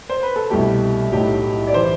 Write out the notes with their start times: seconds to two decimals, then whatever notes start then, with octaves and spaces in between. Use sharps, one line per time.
0.09 C5
0.23 B4
0.36 A4
0.50 C2 B2 A3 G4
1.12 B1 A2 F#3 A3 G4
1.67 D5
1.74 E3 C5